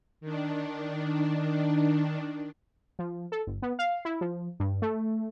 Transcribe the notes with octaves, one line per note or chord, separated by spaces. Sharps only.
D#3 D4
F3
A4
G1
B3
F5
E4
F3
G2
A3